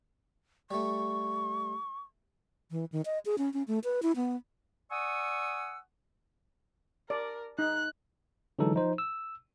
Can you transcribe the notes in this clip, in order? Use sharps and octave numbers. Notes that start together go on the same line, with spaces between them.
G3 A3 C#6
E3
D#3
D#5
G#4
C#4
C#4
A3
B4
E4
B3
D5 F#5 G#5 C#6 D#6 E6
A#4 D5
D#4 F#6
D3 E3 F#3 G#3 D#4 A4
F3 D#4 C5
E6